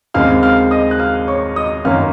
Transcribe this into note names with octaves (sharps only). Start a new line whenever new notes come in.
D#2 C#3 G#3 C4 F5 F6
F5 F6
D#5 D#6
F#6
F5 F6
C#5 C#6
D#5 D#6
F#2 D#3 A#3 C#4 F5 F6